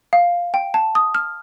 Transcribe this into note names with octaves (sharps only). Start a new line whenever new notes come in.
F5
G5
A5
D#6
F6